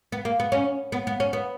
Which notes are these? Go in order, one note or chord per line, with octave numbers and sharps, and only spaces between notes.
B3
A#3
B3
C#4
B3
B3
C#4
B3